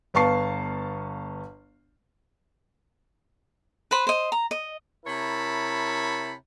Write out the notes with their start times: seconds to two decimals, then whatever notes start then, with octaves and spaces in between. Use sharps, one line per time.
0.14 G1 B3 F5 A5 C#6 C7
3.91 B4 C5 B5
4.07 C5 D#5
4.32 A#5
4.51 D#5
5.05 C3 E4 A#4 C#5 A5 B5